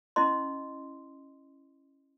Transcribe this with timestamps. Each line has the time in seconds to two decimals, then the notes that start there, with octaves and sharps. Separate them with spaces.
0.16 C#4 E4 D#5 C6